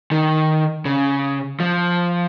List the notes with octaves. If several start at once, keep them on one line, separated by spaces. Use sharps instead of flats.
D#3
C#3
F3